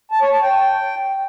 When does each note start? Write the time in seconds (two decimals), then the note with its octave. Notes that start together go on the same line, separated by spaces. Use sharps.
0.12 A5
0.22 C#5
0.32 A5
0.42 G5